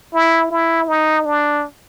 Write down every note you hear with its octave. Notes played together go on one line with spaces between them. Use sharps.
E4
E4
D#4
D4